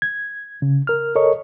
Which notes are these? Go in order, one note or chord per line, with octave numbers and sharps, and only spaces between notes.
G#6
C#3
A#4 F6
A4 A#4 C#5 D#5 C#6